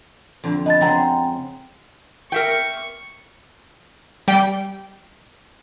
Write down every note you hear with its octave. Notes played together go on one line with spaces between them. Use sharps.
F2 D3
B3 D#5 A5 A6
C#3 G#3 C4 F#5 G5 A#5
A#4 E5 G5 C#6
G3 G5